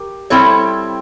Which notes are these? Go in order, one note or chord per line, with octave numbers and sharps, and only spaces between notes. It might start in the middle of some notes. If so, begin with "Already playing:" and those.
Already playing: G4 A#4
G3 C4 E4 A4 C#5